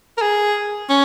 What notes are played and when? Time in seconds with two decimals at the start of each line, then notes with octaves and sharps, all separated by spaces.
0.18 A#4
0.22 G#4
0.89 C#4